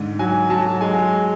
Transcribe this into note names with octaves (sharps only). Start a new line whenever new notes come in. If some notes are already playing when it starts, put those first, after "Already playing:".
Already playing: G#2 D3
F#3 G#5
F#3 A5
G#3 G#5